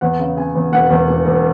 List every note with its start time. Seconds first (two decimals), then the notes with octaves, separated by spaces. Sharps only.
0.01 E2 F#5
0.19 C#3
0.37 C#3 G#5
0.55 E2
0.72 E1 F#5
0.90 E2
1.08 E1
1.25 E1